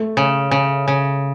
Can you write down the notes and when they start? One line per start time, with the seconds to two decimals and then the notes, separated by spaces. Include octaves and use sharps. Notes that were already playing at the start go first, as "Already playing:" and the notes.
Already playing: A3
0.17 C#3
0.51 C#3
0.88 C#3